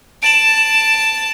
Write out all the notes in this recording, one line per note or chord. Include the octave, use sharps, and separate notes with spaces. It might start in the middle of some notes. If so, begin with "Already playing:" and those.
A5 D7 E7 F#7